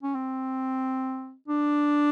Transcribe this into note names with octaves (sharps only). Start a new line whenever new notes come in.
C#4
C4
D4